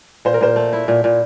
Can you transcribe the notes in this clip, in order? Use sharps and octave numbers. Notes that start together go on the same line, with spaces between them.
A#2 C5
A#4
A#2 C5
A3
E4
A#2
A#2